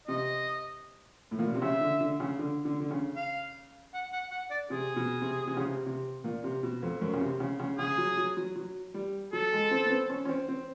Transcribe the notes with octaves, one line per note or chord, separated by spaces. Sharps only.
C3 D#5
A2
A#2
B2
C3
C#3 E5
D3
D3
C#3
D3
D3
D3
C#3
F5
F#5
F#5
F#5
D5
C3 G#4
B2
C3
C3
C#3
C3
C3
A#2
C3
B2
F2
F#2
C#3
C3
C#3
C#3
C#3 G#4
F#3
F#3
F#3
F#3
G3
F#3 A4
G#3
C4
B3
C4
C#4
C#4
C4
C4